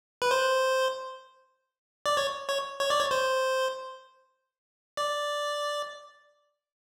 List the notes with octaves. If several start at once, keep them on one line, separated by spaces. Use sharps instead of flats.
B4
C5
D5
C#5
C#5
C#5
D5
C#5
C5
D5